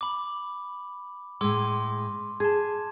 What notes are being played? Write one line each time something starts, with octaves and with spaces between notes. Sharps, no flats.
B5 D6
A2 G#3 C6 D6 E6
G#4 A5 G#6